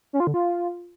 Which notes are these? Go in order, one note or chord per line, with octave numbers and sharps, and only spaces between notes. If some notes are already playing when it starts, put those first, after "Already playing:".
C#4
F4
D3
F4